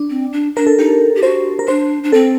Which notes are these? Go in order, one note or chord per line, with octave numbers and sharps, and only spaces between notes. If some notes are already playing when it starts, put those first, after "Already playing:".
Already playing: D4
C4
D4
D4 A#4
A4
D#4 G4
G4
F#4 C5
A#4
D4 C5
D4
C4 A4